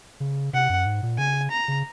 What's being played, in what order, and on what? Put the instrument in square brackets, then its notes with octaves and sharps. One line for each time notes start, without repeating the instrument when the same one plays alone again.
[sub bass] C#3
[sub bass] C3 [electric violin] F#5
[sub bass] F#2
G#2
A#2
[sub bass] C#3 [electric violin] G#5
[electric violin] A#5
[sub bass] C#3